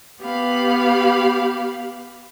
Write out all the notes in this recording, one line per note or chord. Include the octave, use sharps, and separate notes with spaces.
B3 G4 F5 B5